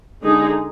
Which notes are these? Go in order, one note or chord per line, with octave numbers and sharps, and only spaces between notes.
D3 G#3 D#4 G#4